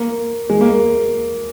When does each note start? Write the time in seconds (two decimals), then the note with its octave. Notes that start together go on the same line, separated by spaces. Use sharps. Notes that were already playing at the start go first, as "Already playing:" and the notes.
Already playing: A#3
0.49 G#3
0.61 A#3